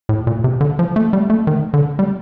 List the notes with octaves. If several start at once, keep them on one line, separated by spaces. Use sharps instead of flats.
A2
A#2
C3
D3
F3
A3
G3
A3
D#3
D3
G3